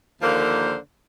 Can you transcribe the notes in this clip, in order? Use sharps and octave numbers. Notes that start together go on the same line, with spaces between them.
D#2 D3 F3 A#3 C5